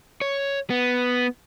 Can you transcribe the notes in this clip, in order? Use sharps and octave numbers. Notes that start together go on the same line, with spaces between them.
C#5
B3